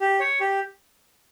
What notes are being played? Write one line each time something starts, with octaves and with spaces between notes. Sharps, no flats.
G4
C#5
G4